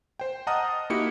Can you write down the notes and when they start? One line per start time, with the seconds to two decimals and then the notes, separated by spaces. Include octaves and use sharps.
0.20 C5 G5
0.47 D#5 F#5 A5 A#5 D#6 F6
0.90 A#3 D#4 E4 F#4 G4 C#7